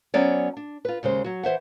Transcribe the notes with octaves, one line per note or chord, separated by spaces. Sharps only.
F#3 B3 C#4 C5 D5
D4
F4 B4
D#2 C#3 G#3 C5
F#3 F#4
E3 C5 E5 F#5